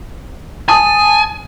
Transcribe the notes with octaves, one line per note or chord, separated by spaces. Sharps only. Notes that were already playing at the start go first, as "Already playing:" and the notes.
G#5 A5 D#6